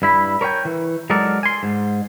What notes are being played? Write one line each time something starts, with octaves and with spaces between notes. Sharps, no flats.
G2 E4 B5
A#4 C#5 E5 G5 G#5
E3
F#3 G#3 D#4 A4 A#4 D5
G#5 C6
G#2